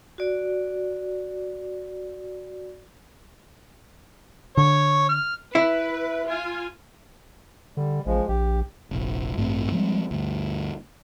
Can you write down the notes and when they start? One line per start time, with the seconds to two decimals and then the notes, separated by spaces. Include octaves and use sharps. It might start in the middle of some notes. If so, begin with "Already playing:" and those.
0.18 F#4 D5
4.57 D3 C#5
5.09 F6
5.55 E4 B4
6.28 F4 G#5
7.77 D3 G3
8.06 A1 F3 G#3
8.28 A#1 G4
8.91 F1 A#1
9.36 A1 G2 A3 C4
9.72 F3 G3 G#3 C4
10.11 D2 G2